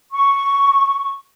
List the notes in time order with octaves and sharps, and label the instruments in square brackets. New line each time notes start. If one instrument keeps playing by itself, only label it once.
[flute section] C#6